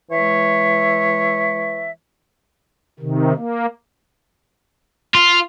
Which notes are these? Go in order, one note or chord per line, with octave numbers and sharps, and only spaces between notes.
E3 G#3 C#5 E5
C3 D#3
A#3
F4